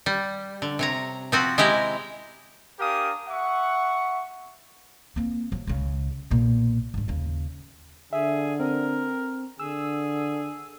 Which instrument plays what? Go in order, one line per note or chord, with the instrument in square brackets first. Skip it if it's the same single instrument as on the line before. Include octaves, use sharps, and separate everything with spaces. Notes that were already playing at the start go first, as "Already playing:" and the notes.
[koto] G3
D3
C3 C#5 A#5
F3 C4 F#4
G#3 E4 G4 A#5
[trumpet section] D4 G4 A#4 F5 G#5 D#6
E5 F#5 C#6
[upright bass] A#3 C4
F3 F#3
C#2 C#3
B1 A#2
G#2 D3
D#2 C#3
[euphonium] D3 [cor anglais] G#4 [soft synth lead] E5
[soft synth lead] C4 [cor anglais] A#4
[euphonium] D3 [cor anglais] G#4 [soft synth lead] E6